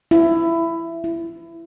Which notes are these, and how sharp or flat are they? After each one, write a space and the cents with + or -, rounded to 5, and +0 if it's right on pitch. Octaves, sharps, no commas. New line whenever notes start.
E4 +15
E4 +20